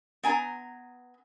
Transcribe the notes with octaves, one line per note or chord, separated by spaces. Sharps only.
B3 G#5 A#5